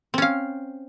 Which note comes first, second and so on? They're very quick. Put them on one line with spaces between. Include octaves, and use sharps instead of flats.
C4 C#4 F5